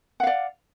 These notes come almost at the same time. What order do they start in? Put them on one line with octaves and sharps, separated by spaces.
F#5 F5 D5